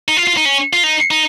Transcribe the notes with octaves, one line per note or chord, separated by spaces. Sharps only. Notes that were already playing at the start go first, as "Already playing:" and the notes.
D#4
F4
F4
D#4
C#4
F4
D#4
D#4